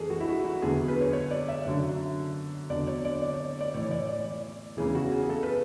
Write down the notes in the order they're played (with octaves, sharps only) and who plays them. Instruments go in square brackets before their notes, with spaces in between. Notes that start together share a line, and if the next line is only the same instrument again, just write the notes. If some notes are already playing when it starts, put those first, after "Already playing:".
Already playing: [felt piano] F#2 E3 G#4 A4
F#4
E4
F#4
F#4
E2 D3 F#3 G#4
B4
C#5
C#5
D5
E5
F#2 D3 F#3
E2 D3 F#3 D5
C#5
D5
D5
C#5
D5
A2 E3 C#5
D5
D5
E2 C#3 E3 G#4
F#4
G#4
A4
B4